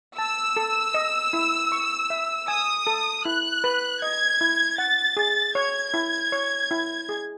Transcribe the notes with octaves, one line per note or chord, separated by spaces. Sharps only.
A5 E6
A4
D#5
E4
C#6
E5
G#5 D#6
A4
E4 F#6
B4
D#5 G#6
E4
F#5 A6
G#4
C#5 G#6
E4
C#5
E4
G#4